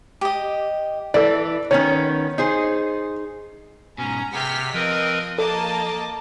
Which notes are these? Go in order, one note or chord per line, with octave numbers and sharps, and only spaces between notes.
G4 D#5
E3 A4 D5
D#3 B3 C#4 C#5
D#4 G#4 C5
G#2 B2 C#4 A#5
C3 B3 G#4 G5 F6 B6
F3 C4 A#4 B4 D#5
A#3 A4 D#5 A5 D6